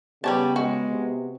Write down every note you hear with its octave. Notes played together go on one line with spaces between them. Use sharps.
C#3 G3 B3 G4 C#5 A5
G#3 F#4
C3